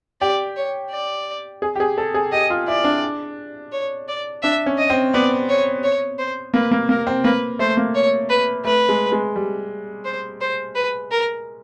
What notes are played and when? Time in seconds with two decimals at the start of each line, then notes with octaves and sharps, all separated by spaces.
0.21 G4 D5
0.56 C#5
0.91 D5
1.62 G#4
1.76 G4
1.80 G#4
1.98 A4
2.14 G#4
2.32 G4 D#5
2.50 F4
2.68 E4 D5
2.84 D4
3.72 C#5
4.08 D5
4.43 D4 E5
4.66 C#4
4.78 D#5
4.90 C4
5.13 B3 D5
5.49 C#5
5.84 C#5
6.18 C5
6.54 A#3 B4
6.71 A#3
6.89 A#3 A#4
7.07 C4
7.24 A#3 B4
7.59 A3 C5
7.77 A#3
7.95 C#5
8.30 B4
8.64 A3 B4
8.89 G#3
9.12 G#3
9.36 G3
10.05 C5
10.41 C5
10.75 B4
11.11 A#4